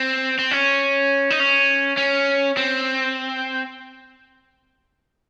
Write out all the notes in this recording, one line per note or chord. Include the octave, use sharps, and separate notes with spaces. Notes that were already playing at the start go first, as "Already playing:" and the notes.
Already playing: C4
C4
C#4
D#4
C#4
C#4
C4